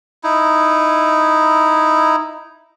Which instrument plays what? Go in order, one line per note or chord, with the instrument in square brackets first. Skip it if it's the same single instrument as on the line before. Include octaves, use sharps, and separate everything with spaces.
[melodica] D#4 E4